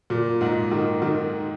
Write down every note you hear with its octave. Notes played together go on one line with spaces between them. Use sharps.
A#2
G#2
D#3
D#3